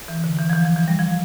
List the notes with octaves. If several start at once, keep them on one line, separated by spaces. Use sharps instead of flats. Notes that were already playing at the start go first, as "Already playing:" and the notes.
E3
D3
E3
F3
E3
F3
E3
G3
F3